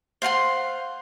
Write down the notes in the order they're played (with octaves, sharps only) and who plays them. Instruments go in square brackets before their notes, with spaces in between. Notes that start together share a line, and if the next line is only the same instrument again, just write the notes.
[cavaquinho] C5 F5 F#5 C6